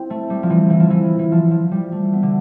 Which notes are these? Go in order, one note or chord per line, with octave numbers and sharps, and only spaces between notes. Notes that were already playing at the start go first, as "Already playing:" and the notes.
Already playing: C4 E4
A3
G3
F3
E3
E3
F3
E3
E3
F3
F3
G3
A3
B3
D3